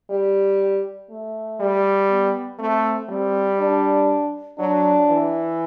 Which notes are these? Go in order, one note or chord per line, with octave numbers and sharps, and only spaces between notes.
G3
A3
G3
B3
A3 C4
G3 C4
D4
F#3 D4
E3